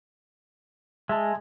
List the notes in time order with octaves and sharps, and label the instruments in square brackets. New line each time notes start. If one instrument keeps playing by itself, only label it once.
[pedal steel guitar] G#3 [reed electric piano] E5 G#5 A5